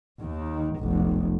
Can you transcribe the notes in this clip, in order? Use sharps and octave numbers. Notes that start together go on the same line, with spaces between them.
D#2 D#3
F1 B1